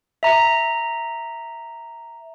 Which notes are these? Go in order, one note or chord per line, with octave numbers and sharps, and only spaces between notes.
E5 A#5